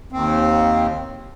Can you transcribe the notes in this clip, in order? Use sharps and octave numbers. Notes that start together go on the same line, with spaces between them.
D#2 C4